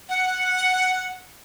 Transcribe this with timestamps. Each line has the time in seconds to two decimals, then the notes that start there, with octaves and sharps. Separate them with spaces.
0.09 F#5